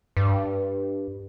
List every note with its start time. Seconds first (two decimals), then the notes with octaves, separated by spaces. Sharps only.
0.17 G2